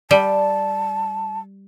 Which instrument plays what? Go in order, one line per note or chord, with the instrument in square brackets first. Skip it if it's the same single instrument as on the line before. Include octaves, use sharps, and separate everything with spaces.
[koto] G3 [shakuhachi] A5